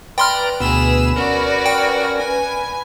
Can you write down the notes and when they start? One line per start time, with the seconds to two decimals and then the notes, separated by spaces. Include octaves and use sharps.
0.18 B4 D5 G5 A#5 C6 F6
0.60 D2 B2 B3 G#4 E6
1.16 C#4 F#4 A#4 D5
1.66 G5
2.17 G#5